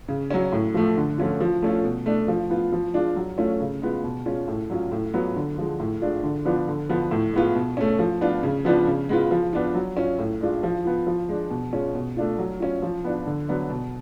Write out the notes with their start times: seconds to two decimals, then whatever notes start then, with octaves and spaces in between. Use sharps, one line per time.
0.08 C#3
0.30 F#3 C#4
0.52 A2
0.74 F3 A3
0.97 D3
1.18 F3 A3 C#4 F4
1.40 F3
1.62 A3 C#4 F4
1.84 B2
2.06 A3 D4
2.28 F3
2.50 B3 F4
2.72 F3
2.94 G#3 D4 F4
3.16 F#3
3.38 A3 C#4 F4
3.60 C#3
3.82 G#3 B3 F4
4.04 B2
4.26 G#3 C#4 F4
4.48 A2
4.70 F#3 C#4 F4
4.91 A2
5.14 F#3 B3 F4
5.36 D3
5.58 F3 G#3
5.80 A2
6.01 G#3 D4 F4
6.23 D3
6.45 F3 B3 D4 F4
6.68 D3
6.89 F3 B3
7.11 A2
7.33 G#3 B3 F4
7.55 B2
7.77 A3 C#4
7.99 F3
8.21 B3 D4 F4
8.43 C#3
8.65 F3 B3 D4 F4
8.87 C#3
9.09 G#3 B3 F4
9.31 F3
9.53 B3 D4 F4
9.75 F#3
9.97 C#4 F4
10.19 A2
10.41 G#3 D4 F4
10.63 F3
10.85 B3 F4
11.07 F3
11.29 G#3 D4
11.50 B2
11.73 G#3 C#4 F4
11.95 B2
12.16 A3 D4 F4
12.38 F#3
12.60 C#4 F4
12.82 F3
13.04 B3 D4 F4
13.26 D3
13.48 F#3 B3 D4
13.70 B2